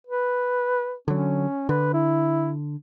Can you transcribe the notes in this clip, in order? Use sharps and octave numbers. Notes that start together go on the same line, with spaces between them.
B4
D3 F#3 C#4
D3 B4
E4